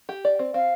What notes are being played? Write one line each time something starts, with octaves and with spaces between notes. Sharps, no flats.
G4
D5
C4
C4 F5